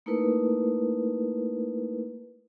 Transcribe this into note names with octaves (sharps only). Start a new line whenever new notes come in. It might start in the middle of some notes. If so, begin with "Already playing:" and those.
A3 A#3 D#4 E4 A#4 B4